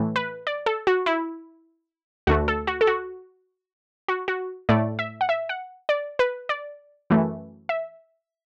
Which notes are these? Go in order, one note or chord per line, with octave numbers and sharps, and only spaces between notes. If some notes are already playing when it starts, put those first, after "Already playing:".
Already playing: A2 E3 A3
B4
D5
A4
F#4
E4
D2 D3 A3 F#4
A4
F#4
A4
F#4
F#4
F#4
A2 A3 D5
E5
F#5
E5
F#5
D5
B4
D5
F#2 E3 A3
E5